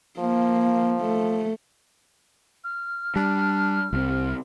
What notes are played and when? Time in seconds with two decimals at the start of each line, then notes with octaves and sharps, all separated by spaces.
0.19 F3 A#3
1.01 A3
2.64 F6
3.16 G3 D4
3.93 C2 C4